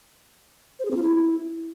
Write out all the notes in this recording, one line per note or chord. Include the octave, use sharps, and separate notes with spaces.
C5
G#4
C4
F4
E4